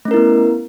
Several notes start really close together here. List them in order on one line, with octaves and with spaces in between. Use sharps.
A3 C#4 A#4 E4 B3